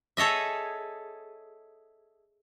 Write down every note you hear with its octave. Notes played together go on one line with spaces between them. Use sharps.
G#4 A4 C#5 D#5 E5